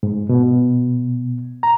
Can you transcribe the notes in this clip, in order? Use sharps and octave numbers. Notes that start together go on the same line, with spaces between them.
G#2
B2
A#5